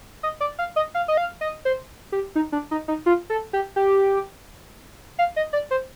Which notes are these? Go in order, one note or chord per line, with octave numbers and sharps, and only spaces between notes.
D#5
D5
F5
D#5
F5
D#5
F5
D#5
C5
G4
D#4
D4
D#4
D#4
F4
A4
G4
G4
F5
D#5
D5
C5